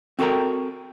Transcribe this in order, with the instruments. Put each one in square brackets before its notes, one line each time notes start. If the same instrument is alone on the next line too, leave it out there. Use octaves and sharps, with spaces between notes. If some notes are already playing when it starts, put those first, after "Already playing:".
[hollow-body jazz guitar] C4 F#4 A4 A#4 G5 A#5